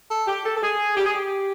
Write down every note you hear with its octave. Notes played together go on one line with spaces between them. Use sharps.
A4
G4
A4
A4
G#4
G4
G#4
G4